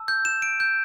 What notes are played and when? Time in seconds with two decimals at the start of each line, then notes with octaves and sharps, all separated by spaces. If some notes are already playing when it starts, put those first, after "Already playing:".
Already playing: A5 E6
0.08 G6
0.25 E7
0.42 D7
0.60 G6